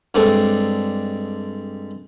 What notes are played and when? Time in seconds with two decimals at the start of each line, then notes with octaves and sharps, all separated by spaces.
0.15 G2 G#3 C4 D4 A4